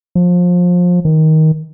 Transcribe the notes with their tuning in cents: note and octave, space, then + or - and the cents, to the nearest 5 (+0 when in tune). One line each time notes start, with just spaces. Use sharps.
F3 +25
D#3 +15